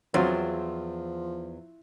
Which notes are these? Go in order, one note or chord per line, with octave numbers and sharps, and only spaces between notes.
E2 F3 F#3 C4 F4